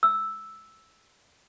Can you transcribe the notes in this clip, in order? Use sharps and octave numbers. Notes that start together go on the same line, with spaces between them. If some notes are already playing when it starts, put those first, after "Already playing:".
E6